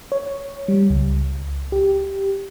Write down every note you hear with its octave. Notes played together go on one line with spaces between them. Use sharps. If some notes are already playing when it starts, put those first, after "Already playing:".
C#5
G3
C#2
G4